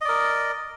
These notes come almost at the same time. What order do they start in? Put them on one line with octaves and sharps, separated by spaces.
D#5 D5 A#4